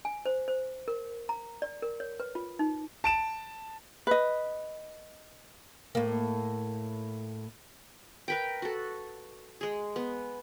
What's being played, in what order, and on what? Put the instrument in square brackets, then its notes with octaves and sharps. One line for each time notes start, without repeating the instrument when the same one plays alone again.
[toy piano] G#5
C5
C5
A#4
A#5
D5
A#4
C#5
B4
F4
D#4
[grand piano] A5 D7 E7
[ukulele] B4 D#5
[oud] A2 A#3
[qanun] A#4 B4 G5
F#4 A4
G#3 G#4
B3